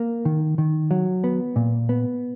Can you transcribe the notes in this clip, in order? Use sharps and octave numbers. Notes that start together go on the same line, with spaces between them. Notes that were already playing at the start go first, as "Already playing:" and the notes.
Already playing: A#3
D#3
D#3
F#3
B3
A#2
B3